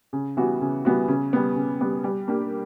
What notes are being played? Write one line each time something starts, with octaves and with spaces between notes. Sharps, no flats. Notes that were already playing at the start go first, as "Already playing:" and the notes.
C#3
E3 G3 B3 F#4
C#3
E3 G3 B3 F#4
C#3
G3 B3
C#3
G3 B3
G3
A#3 D4 G4